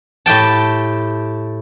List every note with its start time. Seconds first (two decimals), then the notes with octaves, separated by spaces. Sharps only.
0.26 A2 G4 G5 A5